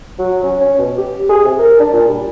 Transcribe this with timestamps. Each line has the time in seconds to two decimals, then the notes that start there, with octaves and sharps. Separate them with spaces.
0.19 F#3
0.43 C#4
0.61 C#4
0.79 B2
0.98 G4
1.29 G#4
1.45 C3
1.59 A#4
1.80 D4
1.93 A#2
2.08 G3